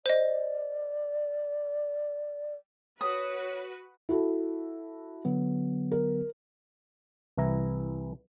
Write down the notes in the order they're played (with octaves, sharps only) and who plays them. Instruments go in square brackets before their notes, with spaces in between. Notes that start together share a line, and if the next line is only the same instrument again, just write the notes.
[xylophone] C5 D#5 [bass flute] D5
[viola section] F#4 B4 [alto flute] C#5 [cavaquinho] D#6
[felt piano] E4 F#4 A4
[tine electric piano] D3 F#3 B3
[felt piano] A#4
[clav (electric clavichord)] C2 E3 E4 A#5